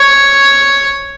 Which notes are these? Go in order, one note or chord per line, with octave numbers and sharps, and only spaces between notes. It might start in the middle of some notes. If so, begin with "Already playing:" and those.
Already playing: C#5